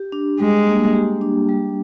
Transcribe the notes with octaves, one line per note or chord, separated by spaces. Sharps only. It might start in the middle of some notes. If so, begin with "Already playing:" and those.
Already playing: G4
D4
G3 G#3
A#3
G4
D4
G3